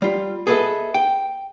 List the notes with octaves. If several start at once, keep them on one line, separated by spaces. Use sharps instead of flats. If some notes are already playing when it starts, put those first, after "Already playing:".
G3 F4
G#4 A4 B4 C5 D#5 E5
G5